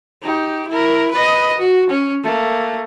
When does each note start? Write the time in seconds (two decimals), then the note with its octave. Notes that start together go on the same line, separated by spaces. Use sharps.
0.22 D#4 G4
0.68 E4 A#4
1.12 B4 D#5
1.58 F#4
1.90 C#4
2.24 A3 A#3